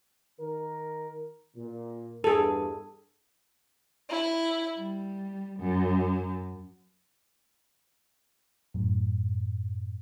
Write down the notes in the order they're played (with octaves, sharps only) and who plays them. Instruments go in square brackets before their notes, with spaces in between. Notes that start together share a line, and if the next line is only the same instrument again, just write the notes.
[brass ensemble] D#3 A#4
A#2
[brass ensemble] E2 G2 [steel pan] G#4 A4
[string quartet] E4
G3
F#2
[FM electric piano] F#2 A2